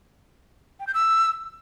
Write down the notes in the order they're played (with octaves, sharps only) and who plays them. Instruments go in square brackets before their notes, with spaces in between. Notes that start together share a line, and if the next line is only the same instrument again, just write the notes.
[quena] G5
G6
E6